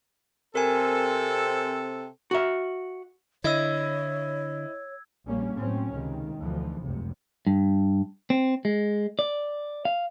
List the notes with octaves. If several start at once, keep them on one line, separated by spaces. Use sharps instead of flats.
C3 C4 A4 A#4 G#5
F#4 E5
D3 E4 C#5 D#5 E6 G#6
A#1 G3 A#3 C#4
A2 F#3 C4 C#4
C#2 C3 D#3
D2 B2 E3 F3
F1 C#2 F#2 C3
G2
C4
G#3
D5
F5